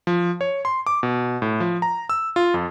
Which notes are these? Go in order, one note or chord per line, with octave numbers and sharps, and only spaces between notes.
F3
C#5
C6
D6
B2
A2
F3
A#5
E6
F4
F2